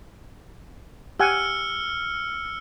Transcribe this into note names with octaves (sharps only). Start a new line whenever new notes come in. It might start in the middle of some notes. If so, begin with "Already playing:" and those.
G4 F#5 G#5 E6 F6 C#7